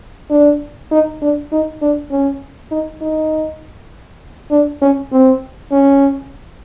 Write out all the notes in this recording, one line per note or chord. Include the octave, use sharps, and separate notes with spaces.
D4
D#4
D4
D#4
D4
C#4
D#4
D#4
D4
C#4
C4
C#4